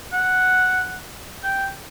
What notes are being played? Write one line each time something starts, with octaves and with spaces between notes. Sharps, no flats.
F#5
G5